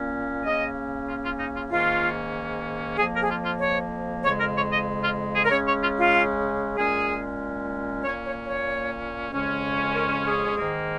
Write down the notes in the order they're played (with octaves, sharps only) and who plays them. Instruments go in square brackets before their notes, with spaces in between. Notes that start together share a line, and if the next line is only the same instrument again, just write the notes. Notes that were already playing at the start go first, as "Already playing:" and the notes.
Already playing: [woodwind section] A#2 A#3 C#4
C#3 A#3 C#4 D#5
F4
F4
D#4
F4
G#2 D#3 A#3 C#4 F4
F2 F3 A#3 G#4
A#4
G#4
F4
F4
C#5
F2 C#3 G#3 C#5
A#4
C#5
D#5
F4
G#4
A#4
C#3 G#3 C#4 C#5
C#5
F4
F4
A#2 G#3 C#4 G#4
A#2 A#3 C#4 C#5
C#5
C#5
F2 C#3 G#3 C#4
A#4
G#4
G#2 D#3 A#3